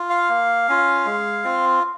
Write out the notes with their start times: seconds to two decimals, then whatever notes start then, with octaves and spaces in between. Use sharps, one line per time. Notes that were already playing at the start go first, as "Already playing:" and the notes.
Already playing: F4
0.10 F5
0.29 A#3
0.68 C#4 F4
1.06 G#3
1.44 C4 F4